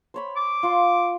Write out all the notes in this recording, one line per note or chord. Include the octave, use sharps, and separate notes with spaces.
C5 C#5 B5
D6
F4 C6